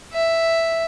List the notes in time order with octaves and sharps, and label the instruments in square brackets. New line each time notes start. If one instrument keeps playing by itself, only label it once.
[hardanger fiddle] E5